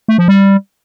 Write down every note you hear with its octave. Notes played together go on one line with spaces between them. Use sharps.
A3
F3
G3